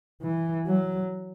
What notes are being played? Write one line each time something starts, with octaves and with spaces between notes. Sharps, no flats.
E3
F#3